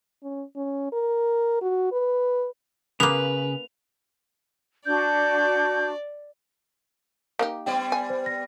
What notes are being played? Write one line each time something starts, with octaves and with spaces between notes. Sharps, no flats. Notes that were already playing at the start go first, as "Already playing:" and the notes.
C#4
C#4
A#4
F#4
B4
C#3 A#3 B3 B4 F7
D4 F#4 D5 G6
A#3 D#4 G4
G3 B3 D5 G5
G#5
C5
A#6